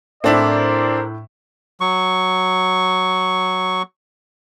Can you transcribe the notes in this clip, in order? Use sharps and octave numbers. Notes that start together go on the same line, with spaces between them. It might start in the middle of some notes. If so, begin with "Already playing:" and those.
A2 C4 D4 E4 A#4 C5 D5
F#3 C#6